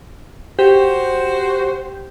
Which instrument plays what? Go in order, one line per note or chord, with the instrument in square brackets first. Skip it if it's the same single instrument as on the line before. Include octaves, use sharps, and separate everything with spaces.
[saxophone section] F#4 C5 [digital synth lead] G4